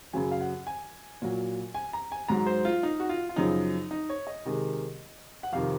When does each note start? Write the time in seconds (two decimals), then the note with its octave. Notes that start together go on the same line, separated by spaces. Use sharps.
0.13 F#2 C#3 F#3 G#5
0.32 F5
0.41 F#5
0.67 G#5
1.22 A#2 F#3
1.74 G#5
1.93 A#5
2.12 G#5
2.28 G#2 F#3 A#5
2.46 C5
2.65 F4
2.83 D#4
3.00 F#4
3.09 F4
3.29 F4
3.36 F#2 C#3 F3 D#4
3.91 D#4
4.09 C#5
4.27 D#5
4.45 C3 D#3 G#3
5.43 F#5
5.52 F2 C3 D#3 F5